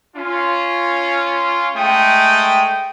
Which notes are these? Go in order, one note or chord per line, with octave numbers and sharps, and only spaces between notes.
C#4 F4
G#3 A3 G5 D#6